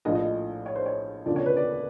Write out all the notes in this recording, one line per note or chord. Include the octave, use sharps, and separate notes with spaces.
A#1 A2 F3 D#5
D#5
C#5
C5
C#5
E1 D2 C#3 F3 D5
C#5
B4
D5